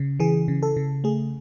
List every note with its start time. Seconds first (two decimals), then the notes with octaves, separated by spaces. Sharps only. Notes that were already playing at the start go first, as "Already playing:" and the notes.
Already playing: C#3
0.20 E3 G#4
0.48 C#3
0.63 A4
0.77 C#3
1.04 A3 G#4